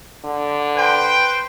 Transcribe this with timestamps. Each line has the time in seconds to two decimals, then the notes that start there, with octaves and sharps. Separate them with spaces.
0.24 D3
0.75 B4 C5 G5